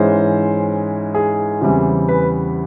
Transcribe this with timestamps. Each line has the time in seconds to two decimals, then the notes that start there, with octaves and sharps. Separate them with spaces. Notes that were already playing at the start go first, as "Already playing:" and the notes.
Already playing: G#2 E3 G#3 C#4 C5
1.14 G#4
1.61 E2 C#3 E3 G3 C4
2.09 B4